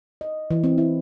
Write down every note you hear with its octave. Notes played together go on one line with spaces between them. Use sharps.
D#5
E3
C4
E4